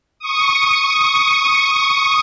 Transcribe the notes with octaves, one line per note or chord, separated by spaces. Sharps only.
C#6 D#6